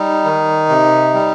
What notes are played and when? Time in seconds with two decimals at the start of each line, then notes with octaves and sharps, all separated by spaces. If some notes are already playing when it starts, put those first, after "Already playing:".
Already playing: G3 D#4
0.25 D#3
0.69 C3
1.14 G3